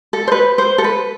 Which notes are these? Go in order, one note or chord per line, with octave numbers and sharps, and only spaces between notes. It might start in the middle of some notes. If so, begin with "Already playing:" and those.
A4
C5
B4
C5
A4
B4